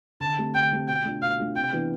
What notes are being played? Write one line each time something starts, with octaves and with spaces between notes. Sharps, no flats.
D3 A5
A3 C4 G4
D3 G5
A3 C4 G4
B2 G5
A3 D4 F4
B2 F5
A3 D4 F4
C3 G5
E3 B3 D4